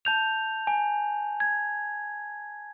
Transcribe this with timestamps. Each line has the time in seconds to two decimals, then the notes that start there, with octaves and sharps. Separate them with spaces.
0.05 A5 G6 F7
0.67 G#5
1.40 G#6